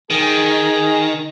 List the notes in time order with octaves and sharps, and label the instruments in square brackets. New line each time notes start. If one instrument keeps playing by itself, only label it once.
[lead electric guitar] D#3 [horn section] G#4